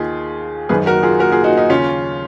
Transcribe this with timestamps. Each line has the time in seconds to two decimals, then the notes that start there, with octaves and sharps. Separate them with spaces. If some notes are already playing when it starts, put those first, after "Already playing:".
Already playing: D#2 D#3 F4 G#4
0.69 G#1 F#2 D#3 G#4 B4
0.86 F#4 A#4
1.03 F4 G#4
1.19 F#4 A#4
1.32 F4 G#4
1.44 D#4 F#4
1.57 D#4
1.70 D#2 C#3 C#4 F4